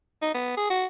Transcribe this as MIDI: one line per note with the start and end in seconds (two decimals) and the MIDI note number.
0.22 0.31 63
0.34 0.53 59
0.57 0.66 68
0.70 0.85 66